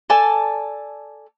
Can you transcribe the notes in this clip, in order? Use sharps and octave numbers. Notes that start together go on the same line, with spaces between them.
A4 D5 G#5 A5